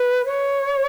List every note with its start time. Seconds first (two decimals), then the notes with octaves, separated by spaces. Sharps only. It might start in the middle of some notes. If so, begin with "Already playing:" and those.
Already playing: B4
0.25 C#5